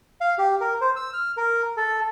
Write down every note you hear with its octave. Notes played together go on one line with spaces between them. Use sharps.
F5
G4
A#4
C5
E6
F6
A#4
A4